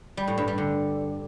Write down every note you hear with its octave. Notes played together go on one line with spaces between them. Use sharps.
G3
A2
G2
G3
D3